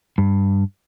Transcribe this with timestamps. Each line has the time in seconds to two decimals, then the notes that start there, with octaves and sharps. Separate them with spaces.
0.18 G2